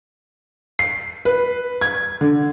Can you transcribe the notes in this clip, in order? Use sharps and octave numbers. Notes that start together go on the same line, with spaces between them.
C7
B4
G#6
D3